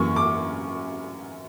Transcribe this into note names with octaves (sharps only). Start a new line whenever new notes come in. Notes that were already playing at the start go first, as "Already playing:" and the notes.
Already playing: F#2 E3 A#3 C#4 C#6
D6